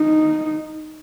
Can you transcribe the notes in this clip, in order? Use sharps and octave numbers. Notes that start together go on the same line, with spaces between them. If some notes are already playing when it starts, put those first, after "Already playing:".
Already playing: D#4